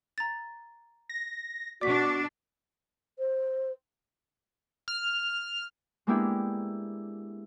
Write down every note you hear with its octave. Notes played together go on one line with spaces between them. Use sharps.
A#5 A6
A#6
B2 D4 F#4 D5 D6 B6
C5
F6
G#3 A#3 B3 D4 E4 G4